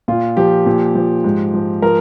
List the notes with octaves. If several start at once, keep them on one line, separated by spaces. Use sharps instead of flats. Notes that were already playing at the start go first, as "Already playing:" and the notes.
A#2 F4
F3 G4
A#2
F3
G#2
F3
F3 A#4